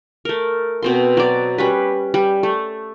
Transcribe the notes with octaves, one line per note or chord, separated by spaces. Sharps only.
A3 A#4
B2 C4 C6
F#3 D5
G3 C#4 B4
G3
A3